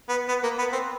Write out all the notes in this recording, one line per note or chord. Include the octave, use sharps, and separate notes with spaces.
B3
B3
A#3
B3
C4